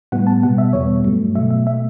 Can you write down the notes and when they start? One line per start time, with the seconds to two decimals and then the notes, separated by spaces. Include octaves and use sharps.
0.12 A2 G3 B3 F#5
0.27 A5
0.42 B2 G3 B3 F#5
0.58 E5
0.73 E2 B2 G3 B3 C#5
1.04 G2 F#3 A3
1.35 B2 F#3 A3 E5
1.50 E5
1.67 B2 A3 E5